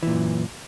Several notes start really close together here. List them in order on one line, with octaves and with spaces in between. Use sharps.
E3 A#2 F#2